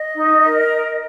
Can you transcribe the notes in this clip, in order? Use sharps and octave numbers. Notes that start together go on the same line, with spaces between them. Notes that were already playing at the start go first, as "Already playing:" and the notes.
Already playing: D#5
D#4
A#4